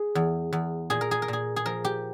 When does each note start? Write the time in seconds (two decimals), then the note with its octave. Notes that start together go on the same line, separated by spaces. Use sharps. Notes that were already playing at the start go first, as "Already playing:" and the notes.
Already playing: G#4
0.15 E2
0.53 E2
0.90 A#2 G#4
1.01 A#4
1.11 G#4
1.22 A#4
1.28 A#2 G#4
1.56 G#4
1.66 F3 A#4
1.85 G4